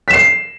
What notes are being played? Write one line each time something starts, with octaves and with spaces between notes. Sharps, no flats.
B6 C7 E7